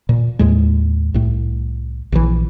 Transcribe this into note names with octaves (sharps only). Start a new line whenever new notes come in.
A#2
D#2 A2 G#3
C2 A2
A#1 C#3 E3